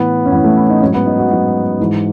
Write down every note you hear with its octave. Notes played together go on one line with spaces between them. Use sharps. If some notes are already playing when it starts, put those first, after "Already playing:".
Already playing: A2 E3 B3
C#4
A2 E3 B3
A3
E4
D#4
G#2 F#3 C#4
B3
D#4
F#4
G#2 F#3 F#4
G#2 E3